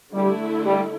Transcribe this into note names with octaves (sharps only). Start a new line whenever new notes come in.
D3 G3 A3 E4
G3